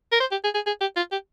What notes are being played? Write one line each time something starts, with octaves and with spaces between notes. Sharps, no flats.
A#4
C5
G4
G#4
G#4
G#4
G4
F4
G4